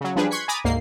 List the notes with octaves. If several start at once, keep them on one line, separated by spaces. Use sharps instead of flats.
C#3 F#3
F3 G3 D4 G#4 B4
C6 C#6 F#6 G#6 B6 C#7
G#5 A#5 B5 D6 D#6 A6
D2 G#2 A#3 C7